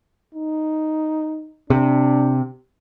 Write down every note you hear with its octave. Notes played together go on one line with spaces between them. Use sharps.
D#4
C3 D4